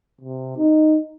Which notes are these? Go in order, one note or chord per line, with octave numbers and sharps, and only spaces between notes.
C3
D#4